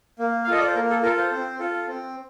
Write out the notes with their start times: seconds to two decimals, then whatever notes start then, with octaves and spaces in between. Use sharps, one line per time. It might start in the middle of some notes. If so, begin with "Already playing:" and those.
0.19 A#3
0.44 F5
0.48 F4 A4 D#5
0.59 D5
0.67 C5
0.74 A#3 A#4
0.90 A4
1.03 F4 A4 A#4
1.18 C5
1.32 C4
1.59 F4 A4
1.88 C4